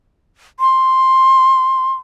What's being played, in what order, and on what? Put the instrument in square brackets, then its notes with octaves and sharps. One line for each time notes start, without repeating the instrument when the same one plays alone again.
[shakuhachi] C6